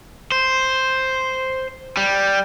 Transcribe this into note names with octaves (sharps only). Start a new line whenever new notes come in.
C5
G3